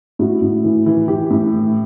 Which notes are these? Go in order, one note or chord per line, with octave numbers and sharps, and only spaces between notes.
A2 F#4
A2
E3
E3
E3 G4
A2
E3